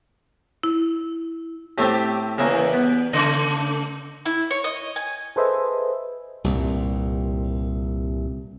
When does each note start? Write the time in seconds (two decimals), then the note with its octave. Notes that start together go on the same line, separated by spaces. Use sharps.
0.63 E4
1.78 A2 A3 C4 G4
2.38 E2 C#3 E3 A#3
2.73 B3
3.13 C#3 A3 D#5
4.26 E4
4.51 C#5
4.64 D#5
4.96 G#5
5.36 G#4 A4 B4 C5 D#5 E5
6.44 C2 G2 A#2